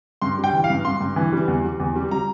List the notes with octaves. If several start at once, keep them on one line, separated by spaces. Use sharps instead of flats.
G2 C6
G3
G5
E3
F5
G2
G2 C6
G2
E3
G3
E2
G3
E2
G3
G3 A#5